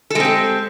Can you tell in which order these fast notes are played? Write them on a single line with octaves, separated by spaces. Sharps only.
A4 G#3 C4 G4